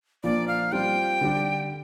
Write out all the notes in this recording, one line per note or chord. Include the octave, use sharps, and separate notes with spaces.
A#2 F3 A#3 D4 D5
F5
G3 C4 F4 G5
D3 G3 D4